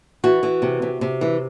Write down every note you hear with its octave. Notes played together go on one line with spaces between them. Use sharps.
E3 F#4
E3
C3
C3
C3
E3